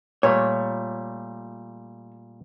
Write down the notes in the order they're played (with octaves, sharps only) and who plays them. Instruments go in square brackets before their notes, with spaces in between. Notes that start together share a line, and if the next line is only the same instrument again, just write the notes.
[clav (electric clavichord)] A#2 G3 A3 [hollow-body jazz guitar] C#5